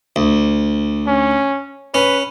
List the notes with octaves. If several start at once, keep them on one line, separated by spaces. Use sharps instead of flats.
D2
C#4
C#4 B4